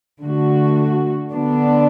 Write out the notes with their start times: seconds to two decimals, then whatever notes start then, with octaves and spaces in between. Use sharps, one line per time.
0.21 D3 A3 F#4
1.33 D3 B3 D4